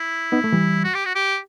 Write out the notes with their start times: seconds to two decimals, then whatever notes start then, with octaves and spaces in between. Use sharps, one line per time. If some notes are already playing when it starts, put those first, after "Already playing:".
Already playing: E4
0.32 B3 D#4
0.44 A3
0.52 E3 G3
0.84 F#4
0.94 G4
1.05 F#4
1.15 G4